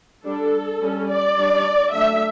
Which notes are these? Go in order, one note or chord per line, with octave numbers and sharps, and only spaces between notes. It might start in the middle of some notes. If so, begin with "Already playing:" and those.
G3 D4 A4
G3 C#4
D5
G3 D4
F#3 A3 D4 E5